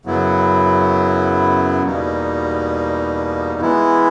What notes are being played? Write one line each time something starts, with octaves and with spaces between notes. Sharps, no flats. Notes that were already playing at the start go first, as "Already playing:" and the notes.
F#2 C#3 F#3 B3 E4
E2 B2 G3 A#3 D#4
E3 G#3 B3 E4